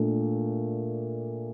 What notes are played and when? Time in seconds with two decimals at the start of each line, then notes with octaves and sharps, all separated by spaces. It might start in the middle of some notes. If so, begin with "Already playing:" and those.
Already playing: A#2 A3 D4